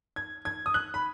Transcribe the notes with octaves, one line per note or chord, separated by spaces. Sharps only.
G#6
G#6
D#6
F#6
B5